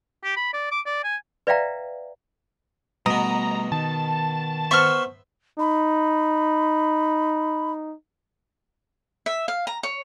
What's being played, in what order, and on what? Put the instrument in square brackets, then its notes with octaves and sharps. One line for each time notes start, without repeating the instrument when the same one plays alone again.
[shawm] G4
B5
D5
D6
D5
G#5
[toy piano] B4 D5 E5 F5 G5 A#5
[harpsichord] B2 B3 [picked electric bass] G3 A3 [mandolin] D#5 [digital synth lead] A#5
[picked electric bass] D#3 [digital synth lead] A5
[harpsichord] B3 C5 E5 [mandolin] C#6 F6
[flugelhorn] D#4 [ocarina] B5
[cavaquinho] E5
F5
A#5
C#5